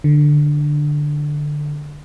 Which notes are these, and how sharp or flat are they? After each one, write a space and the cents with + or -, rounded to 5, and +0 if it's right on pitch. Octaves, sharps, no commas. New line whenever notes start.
D3 +10